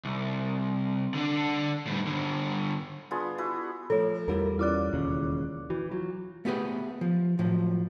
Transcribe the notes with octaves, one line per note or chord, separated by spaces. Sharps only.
C2
D3 D4
A2 G3
G2 D3
B3 D4 F4 G#4
E4 F#4 B4
F3 A3 A4 C#5
E2 G3 E4 F4 A#4
C#4 E4 F4 D5 D6 F#6
E1 D#2 C#3
E3 F#4
F#3 F4
A3 B3 G4 G#4 B4
F3
A2 F3 F#3